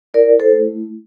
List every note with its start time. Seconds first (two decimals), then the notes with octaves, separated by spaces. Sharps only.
0.14 E4 A#4 D5
0.40 A4 C5
0.52 A3